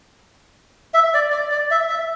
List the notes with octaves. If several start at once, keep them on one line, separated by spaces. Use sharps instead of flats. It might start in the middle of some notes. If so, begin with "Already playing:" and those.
E5
D5
D5
D5
E5
E5